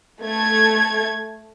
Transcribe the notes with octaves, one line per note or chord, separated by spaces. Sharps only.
A3 G#6